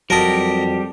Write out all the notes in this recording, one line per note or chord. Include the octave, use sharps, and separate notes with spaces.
F2 F#3 G3 F#4 G4 A#4 D#5 A5